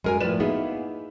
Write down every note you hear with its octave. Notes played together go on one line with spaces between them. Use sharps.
F#2 F#3 G#3 A#4 G#5
A2 F3 B4 D5 E7
A#3 B3 D#4 E4 G#4